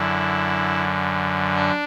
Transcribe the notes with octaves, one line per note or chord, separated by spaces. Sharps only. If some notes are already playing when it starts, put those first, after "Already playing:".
Already playing: F#2 D3 E4
D4